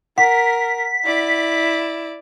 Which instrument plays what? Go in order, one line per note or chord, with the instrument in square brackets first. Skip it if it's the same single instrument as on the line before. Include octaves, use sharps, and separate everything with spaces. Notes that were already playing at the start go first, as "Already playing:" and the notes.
[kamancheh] A#4 [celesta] F#5 [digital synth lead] B6
[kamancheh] E4 D5